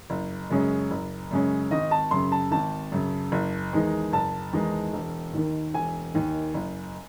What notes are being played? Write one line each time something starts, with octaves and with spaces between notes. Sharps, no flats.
F#1
F#2 C#3 G#3 C#4
F#1
F#2 C#3 G#3 C#4
G#1 D#5
A5
F#2 C#3 C6
A5
G#1 A5
F#2 C#3
F#1
E2 D#3 G#3 D#4
F#1 A5
E2 D#3 G#3 D#4
E1
D#2 D#3
E1 G#5
D#2 D#3
F#1